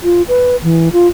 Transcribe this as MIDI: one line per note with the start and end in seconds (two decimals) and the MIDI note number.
0.04 0.22 65
0.28 0.56 71
0.63 0.91 52
0.93 1.08 65